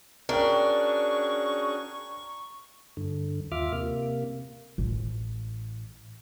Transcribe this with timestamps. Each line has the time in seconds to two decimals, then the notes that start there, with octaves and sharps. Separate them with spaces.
0.29 C#4 D4 F#4 G#4 A#4 G5 C#6
2.97 G2 D3
3.52 D#2 F4 E5 D6 F6
3.72 C3 A#3
4.78 A1